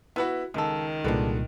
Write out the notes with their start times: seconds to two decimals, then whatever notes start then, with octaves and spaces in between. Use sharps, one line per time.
0.16 B3 E4 F#4 B4
0.54 C#2 D#3 G#3 A4
1.04 C2 A#2 D3 G#3 D4 B4